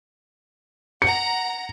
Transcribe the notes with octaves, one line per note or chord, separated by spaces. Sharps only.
F#5 A#5 C#7